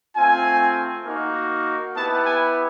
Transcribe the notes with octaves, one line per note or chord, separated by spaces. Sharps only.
A3 C4 F4 G#5
A#3 D#4 F#4
B3 E4 G4 A5
G#5